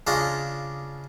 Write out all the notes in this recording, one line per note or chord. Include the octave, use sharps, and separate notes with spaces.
C#3 D4 F4 C#5 D#5